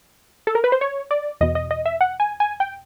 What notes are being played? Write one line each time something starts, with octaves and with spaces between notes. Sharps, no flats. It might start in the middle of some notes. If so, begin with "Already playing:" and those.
A4
A#4
B4
C5
C#5
D5
E2 B2 D#5
D#5
D#5
E5
F#5
G#5
G#5
G5